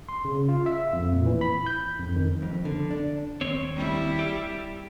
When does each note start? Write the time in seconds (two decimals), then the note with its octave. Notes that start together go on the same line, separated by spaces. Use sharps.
0.09 C6
0.25 C#3
0.48 F4
0.66 E5
0.93 F2
1.13 A#2
1.26 E3
1.41 B5
1.66 G6
2.00 F2
2.16 D#3
2.42 F2
2.65 D3
2.91 D4
3.41 D#2 C4 C#5
3.76 G3 E4
4.19 G4